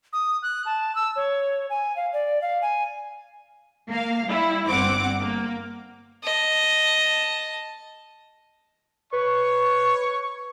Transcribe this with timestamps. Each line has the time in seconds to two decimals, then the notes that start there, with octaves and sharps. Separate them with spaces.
0.13 D#6
0.43 F#6
0.66 A5
0.95 E6
1.16 C#5
1.70 G#5
1.96 F5
2.13 D5
2.42 F5
2.62 G#5
3.89 A#3 F5
4.26 G3 E4
4.67 G1 G2 C4 F#5 D6
5.21 A#3
6.23 D#5 A5
9.13 B4 C#5 C#6